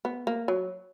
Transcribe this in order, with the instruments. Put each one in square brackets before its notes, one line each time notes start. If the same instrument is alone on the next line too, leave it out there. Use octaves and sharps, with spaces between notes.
[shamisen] B3
A#3
F#3